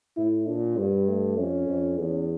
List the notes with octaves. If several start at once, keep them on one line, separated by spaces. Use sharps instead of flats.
A2 E4
A#2 D4
G2 G3
A3
F2 C#4
F2
E2 C#4